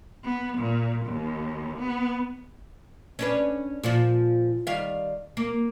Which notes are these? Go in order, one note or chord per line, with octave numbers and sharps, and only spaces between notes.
B3
A#2
D#2
B3
C#4 D4 B4
A#2 F3 F4
D#3 G3 F5
A#3